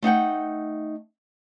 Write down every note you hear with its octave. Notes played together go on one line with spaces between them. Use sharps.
A3 D#4 F#5 G5